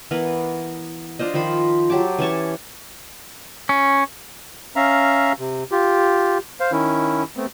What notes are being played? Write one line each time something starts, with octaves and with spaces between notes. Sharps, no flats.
E3 B3 A#4
D4 F4 C5 D#5
D#3 F3 C5 B5
F#3 G4 A5 D6
E3 C#4 A5 C#6
C#4
C#4 E5 F5 A#5
C3
F4 G4
C5 F5
D#3 C#4 E4
A3 B3 C4